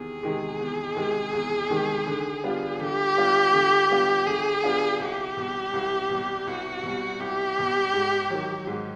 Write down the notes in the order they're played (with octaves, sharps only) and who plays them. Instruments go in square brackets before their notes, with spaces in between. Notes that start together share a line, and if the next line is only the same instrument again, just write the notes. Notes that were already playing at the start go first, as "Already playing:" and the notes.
Already playing: [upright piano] E2 C3 D#3 [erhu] G#4
[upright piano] C3 D#3 G#3
E2
C3 D#3 G#3
E2
C3 D#3 G#3
D3
G3 B3 D4 F4
[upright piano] D3 [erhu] G4
[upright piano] G3 B3 D4 F4
D3
G3 B3 D4 F4
[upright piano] D3 [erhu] G#4
[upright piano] G3 B3 D4 F4
[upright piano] C2 [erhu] G4
[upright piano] B2 G3
C2
B2 G3
[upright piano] C2 [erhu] F#4
[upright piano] B2 G3
[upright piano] C2 [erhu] G4
[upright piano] B2 G3
G#2
D#3 F#3
G#2